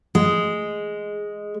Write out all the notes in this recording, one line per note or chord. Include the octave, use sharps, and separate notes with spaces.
G#3